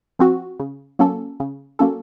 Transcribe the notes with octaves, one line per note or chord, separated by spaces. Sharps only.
F3 C4 F#4
C#3
F#3 A#3 C#4 A4
C#3
F#3 A#3 C#4 A4